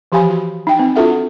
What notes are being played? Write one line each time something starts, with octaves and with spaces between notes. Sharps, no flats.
E3 F3 G4 F5 G#5 B5
F#4
D#4 G5
C4
D4 F4 F#4 A4 E5 F#5